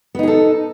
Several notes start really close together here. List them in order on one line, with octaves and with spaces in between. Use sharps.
B3 D#4 G#4 A4